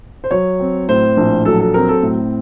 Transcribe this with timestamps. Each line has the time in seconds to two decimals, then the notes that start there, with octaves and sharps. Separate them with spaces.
0.24 C5
0.31 F#3 C#5
0.60 C4
0.89 A2 C5
1.17 A#1
1.45 F#3 A4
1.60 A4
1.74 C4 A#4
1.89 A4
2.03 A2